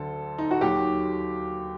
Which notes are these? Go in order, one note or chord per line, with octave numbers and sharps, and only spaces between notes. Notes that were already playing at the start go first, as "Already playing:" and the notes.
Already playing: D2 D3 F#3 A4
D#4
F#4
D#2 D#3 F#3 G4